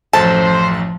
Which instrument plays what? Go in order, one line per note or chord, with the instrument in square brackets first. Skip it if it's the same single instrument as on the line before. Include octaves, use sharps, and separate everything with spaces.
[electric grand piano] A1 F#2 A4 [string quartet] F3 [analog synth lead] C5 [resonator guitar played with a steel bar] A5